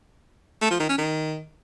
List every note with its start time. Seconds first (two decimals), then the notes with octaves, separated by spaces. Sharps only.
0.62 A3
0.71 F3
0.80 D#3
0.89 C#4
0.98 D#3